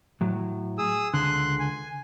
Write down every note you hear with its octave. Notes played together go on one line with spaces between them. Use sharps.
A2 F#3
G#4 D#6 E6
C#2 D3 C6 F#6
G#5